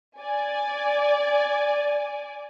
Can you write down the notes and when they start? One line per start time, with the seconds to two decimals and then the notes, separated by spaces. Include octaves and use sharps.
0.19 D5 G#5